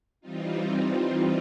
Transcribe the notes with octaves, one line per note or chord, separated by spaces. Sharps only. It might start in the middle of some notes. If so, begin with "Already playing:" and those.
E3 G3 C4 D#4 F4
F4